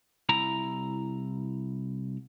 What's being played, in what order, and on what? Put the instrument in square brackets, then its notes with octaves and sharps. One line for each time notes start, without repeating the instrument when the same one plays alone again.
[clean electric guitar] C2 E4 A#5